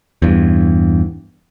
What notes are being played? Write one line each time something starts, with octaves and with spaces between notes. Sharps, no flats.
E2 G2